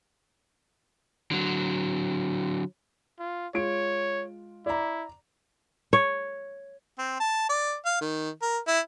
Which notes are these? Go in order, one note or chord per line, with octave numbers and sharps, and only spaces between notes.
D3 F#3
F4
G#3 F4 C#5 D7
E4 D5 A#5
C#5
C4
A5
D5
F5
D#3
A#4
E4